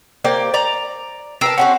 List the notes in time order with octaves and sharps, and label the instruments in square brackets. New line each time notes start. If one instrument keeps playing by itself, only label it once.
[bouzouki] A#3 G4 D5 [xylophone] C5
[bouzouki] D5 A#5
[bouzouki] A#4 B4 A5 [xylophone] G5 E6 C7
[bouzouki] C4 C#4 F#4 [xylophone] F#5